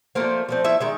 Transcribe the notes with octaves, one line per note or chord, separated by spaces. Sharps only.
F3 A3 A#3 C4 A#4
F3 A3 C4
E4 E5
D#3 G#3 E5